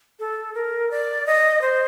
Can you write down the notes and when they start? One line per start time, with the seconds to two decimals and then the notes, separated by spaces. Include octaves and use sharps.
0.19 A4
0.54 A#4
0.91 D5
1.26 D#5
1.61 C5